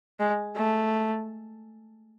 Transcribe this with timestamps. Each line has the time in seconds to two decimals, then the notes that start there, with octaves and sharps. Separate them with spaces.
0.20 G#3
0.56 A3